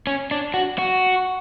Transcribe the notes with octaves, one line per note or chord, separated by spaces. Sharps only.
C#4
D4
F#4
F#4